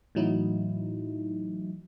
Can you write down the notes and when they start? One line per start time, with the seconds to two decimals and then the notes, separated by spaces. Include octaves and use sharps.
0.15 A2 E3 F#3 D#4 E4